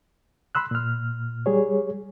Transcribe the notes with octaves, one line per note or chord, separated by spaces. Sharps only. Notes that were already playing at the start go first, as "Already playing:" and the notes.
B5 C6 E6 F#6
A#2 F6
G3 G#4 C#5